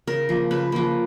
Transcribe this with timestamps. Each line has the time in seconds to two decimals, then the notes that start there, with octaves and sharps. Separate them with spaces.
0.08 C#3 A#4
0.29 F3 A#3
0.51 C#3 B4
0.72 F3 A#3